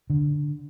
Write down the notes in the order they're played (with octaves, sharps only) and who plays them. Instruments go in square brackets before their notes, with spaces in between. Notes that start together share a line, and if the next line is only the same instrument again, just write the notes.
[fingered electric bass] D3